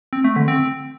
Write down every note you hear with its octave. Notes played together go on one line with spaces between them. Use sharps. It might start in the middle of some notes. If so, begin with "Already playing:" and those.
C4
A3
D3
C4